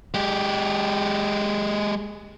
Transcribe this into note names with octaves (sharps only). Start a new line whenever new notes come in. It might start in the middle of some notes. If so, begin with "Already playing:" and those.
G#3 G4